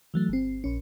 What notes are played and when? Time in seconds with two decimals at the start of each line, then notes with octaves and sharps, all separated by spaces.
0.14 E3 F#3 A3
0.29 G1 C4
0.64 A#1 C#4